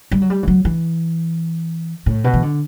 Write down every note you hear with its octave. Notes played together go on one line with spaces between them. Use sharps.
G3
F#3
G3
E3
F#3
E3
A2
B2
E3
D3